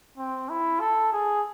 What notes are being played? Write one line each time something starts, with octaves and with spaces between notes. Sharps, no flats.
C4
E4
A4
G#4